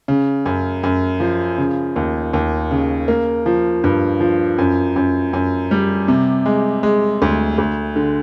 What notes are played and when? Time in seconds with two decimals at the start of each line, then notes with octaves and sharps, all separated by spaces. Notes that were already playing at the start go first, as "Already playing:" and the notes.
0.08 C#3
0.46 F#2
0.83 F#2
1.20 F3
1.58 C#3
1.96 D#2
2.33 D#2
2.71 C#3
3.08 A#3
3.46 F3
3.84 G2
4.20 F3
4.58 F#2
4.96 F#2
5.33 F#2
5.71 G3
6.08 C3
6.46 G#3
6.83 G#3
7.22 D2
7.58 D2
7.96 D3